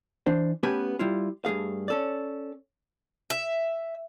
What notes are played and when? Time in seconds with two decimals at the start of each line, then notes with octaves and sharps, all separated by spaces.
0.26 E3 D4 C5
0.63 A3 B3 C#4 G4 B4 G#5
0.99 G3 E4 F4
1.45 G2 A3 G#4 F5
1.88 C#4 A4 D5
3.30 E5